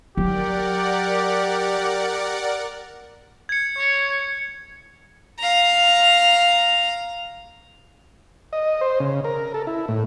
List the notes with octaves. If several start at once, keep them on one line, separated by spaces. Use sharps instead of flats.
F#3 G4 A#4 D5 F#5
G#6 C#7
C#5
F5 A#5
D#5
C5
C#3
A#4
A4
E4
A2